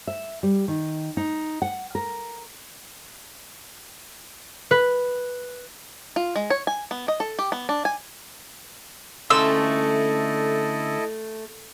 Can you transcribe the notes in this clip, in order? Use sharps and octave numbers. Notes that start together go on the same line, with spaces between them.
E5
G3
D#3
D#4
F#5
A#4
B4
F4
G#3
C#5
G#5
B3
D#5
A4
G4
B3
D4
G#5
D2 A3 C#4 E4 A4 D#5 C6 E6